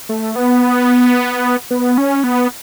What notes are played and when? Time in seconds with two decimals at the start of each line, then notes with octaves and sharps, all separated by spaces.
0.09 A3
0.36 B3
1.71 B3
1.98 C#4
2.24 B3